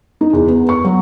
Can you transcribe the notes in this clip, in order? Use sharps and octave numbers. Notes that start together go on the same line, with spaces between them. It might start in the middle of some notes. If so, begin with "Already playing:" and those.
D#4
E2
B3
C#6
F#3